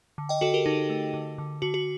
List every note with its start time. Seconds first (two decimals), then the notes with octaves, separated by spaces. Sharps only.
0.18 D3
0.29 D#5 G5
0.41 D3 F#4 A4
0.54 G4 A#4
0.66 D3 D#4
0.90 A3
1.14 D3
1.38 D3
1.62 D3 F#4
1.74 F#4